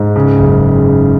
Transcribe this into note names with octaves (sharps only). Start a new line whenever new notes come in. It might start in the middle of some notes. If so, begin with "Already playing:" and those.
Already playing: G#2
C#3
F#1